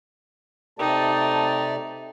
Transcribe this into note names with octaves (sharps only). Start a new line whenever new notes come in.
C3 A3 D#4 G4 D5 G5 A5